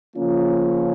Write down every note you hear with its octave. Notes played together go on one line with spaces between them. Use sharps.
C#3 F3 A#3 C#4 F4